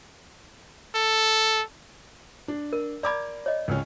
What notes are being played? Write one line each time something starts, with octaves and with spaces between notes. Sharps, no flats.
A4
D4
A#4
D5 A#5 B5 D6 G#6
C#5 D#5
C#2 C#3 C#4